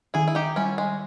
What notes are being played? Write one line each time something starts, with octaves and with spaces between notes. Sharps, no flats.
D#3 E4 G#4
E4
D#4 G4
G3 C#4 E4
G#3